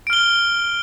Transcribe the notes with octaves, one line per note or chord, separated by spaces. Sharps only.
F6 D7 G7